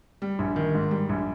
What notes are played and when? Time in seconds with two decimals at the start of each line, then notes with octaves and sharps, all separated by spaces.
0.22 G3
0.39 A#1
0.56 D#3
0.74 G#2
0.91 G3
1.09 A#1